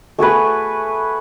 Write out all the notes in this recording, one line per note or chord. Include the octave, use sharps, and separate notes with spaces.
A3 F#4 G#4 B4